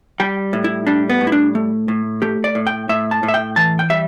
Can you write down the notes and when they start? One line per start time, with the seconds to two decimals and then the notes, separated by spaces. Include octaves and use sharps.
0.20 G3 G5
0.53 A2
0.64 E4
0.87 G3 D4
1.10 B3
1.21 A2
1.27 E4
1.32 D4
1.55 A3
1.88 A2
2.22 A3 G4
2.44 D5
2.55 A2
2.67 G5
2.89 A2 E5
3.11 A5
3.23 A2
3.28 E5
3.34 G5
3.56 E3 A5
3.79 G5
3.90 G3 E5